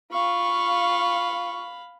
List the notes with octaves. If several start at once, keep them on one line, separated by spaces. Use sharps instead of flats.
F4 F5 B5 C#6